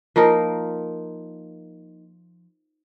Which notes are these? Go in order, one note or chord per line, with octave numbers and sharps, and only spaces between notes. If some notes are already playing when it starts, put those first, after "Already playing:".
F3 A#3 D#4 A#4